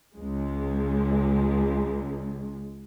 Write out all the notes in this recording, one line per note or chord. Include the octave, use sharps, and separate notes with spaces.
C#2 G#3